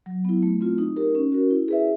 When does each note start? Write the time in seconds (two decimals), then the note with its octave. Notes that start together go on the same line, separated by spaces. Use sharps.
0.06 F#3
0.25 B3 E4
0.43 A3
0.61 C4 F4
0.78 D#4
0.96 G4 A#4
1.15 C#4
1.32 F#4 A#4
1.51 E4
1.68 G#4 B4 E5